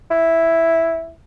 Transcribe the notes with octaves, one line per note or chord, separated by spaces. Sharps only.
E4